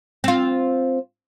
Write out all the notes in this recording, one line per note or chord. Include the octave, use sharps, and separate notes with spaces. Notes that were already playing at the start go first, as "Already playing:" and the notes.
C4 F4